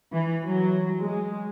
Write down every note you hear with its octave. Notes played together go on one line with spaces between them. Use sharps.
E3
F#3
G#3